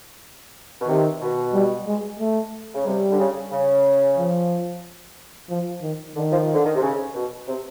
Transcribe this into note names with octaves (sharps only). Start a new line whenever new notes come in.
B2
C3 D#3
B2
G3
G#3
A3
C#3
C3 G3
D3
C#3
C#3
F3
F3
D#3
D3 D#3
F3
D3
D#3
C3
C#3
B2
C3